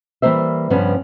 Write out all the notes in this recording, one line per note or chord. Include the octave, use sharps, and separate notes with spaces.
E3 G3 A#3 C5 E5
G2 C#3 F3 B3 C#4